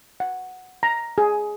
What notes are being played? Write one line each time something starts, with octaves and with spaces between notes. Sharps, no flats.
F#5
A#5
G#4